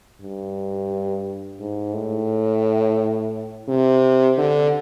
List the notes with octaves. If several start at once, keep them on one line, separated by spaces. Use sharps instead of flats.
G2
G#2
A2
C3
D3